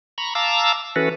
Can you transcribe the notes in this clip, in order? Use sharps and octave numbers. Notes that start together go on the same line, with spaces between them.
A#5 B5 C#6
F5 A5 A#5 D6 E6
E3 C#4 F#4 A4 B4